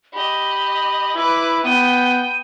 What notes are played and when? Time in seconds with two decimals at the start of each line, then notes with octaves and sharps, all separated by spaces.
0.13 G4 D#5 B5
1.15 E4 B4 D6
1.64 B3 G5 D#7